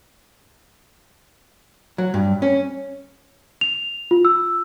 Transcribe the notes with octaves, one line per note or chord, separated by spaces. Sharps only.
F#3
G2
C#4
F7
F4
E6